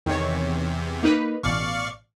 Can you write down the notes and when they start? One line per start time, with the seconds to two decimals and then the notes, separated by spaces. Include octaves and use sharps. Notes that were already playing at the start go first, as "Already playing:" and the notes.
0.06 E2 C3 D#3 C#5
1.03 A#3 D#4 B4
1.43 A1 B2 D5 F5 C#6